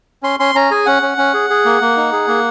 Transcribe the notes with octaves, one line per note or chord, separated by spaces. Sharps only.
C#4 C6
C#4 C6
C#4 A#5
G#4 G#5
C#4 F#5
C#4
C#4
G#4
G#4
A#3
A#3
D#4
G#4
A#3